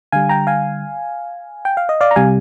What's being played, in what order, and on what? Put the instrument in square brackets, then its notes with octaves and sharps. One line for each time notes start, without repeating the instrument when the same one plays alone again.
[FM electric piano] D3 G3 F5 G#5
G5 A#5
F5 G#5
G5
F5
D#5
D5 F5
A#5
C3 G3 F5 G#5